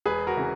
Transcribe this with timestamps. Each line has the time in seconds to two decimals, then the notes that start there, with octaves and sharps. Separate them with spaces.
0.06 E1 G#4 B4
0.27 F#4 A#4
0.37 C#3 E3